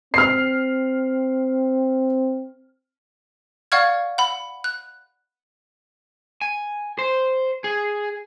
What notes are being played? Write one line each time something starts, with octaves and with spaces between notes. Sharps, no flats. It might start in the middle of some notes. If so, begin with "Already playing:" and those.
C4 F6 C7
D5 F5 F#5 C#6 F6 G#6
F#5 B5
F#6
G#5
C5
G#4